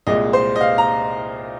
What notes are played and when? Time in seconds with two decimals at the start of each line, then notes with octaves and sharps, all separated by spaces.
0.07 C2 A#2 G#3 D#5
0.33 C5
0.56 D#5
0.61 F5
0.78 A#5